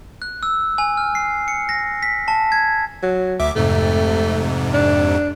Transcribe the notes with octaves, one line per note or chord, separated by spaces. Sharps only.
F#6
E6
G#5
F6
C7
C#7
A#6
B6
A5
G#6
F#3
D2 E5 D6
F2 G#2 C3 A3
D4